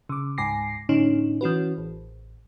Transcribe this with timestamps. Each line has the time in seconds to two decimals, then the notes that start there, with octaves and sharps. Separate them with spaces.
0.09 C#3 D6
0.38 C#2 G#2 G#5 D6 A#6 C7
0.89 A2 D3 C#4 D#4
1.41 E3 C#4 F#4 B4
1.78 A1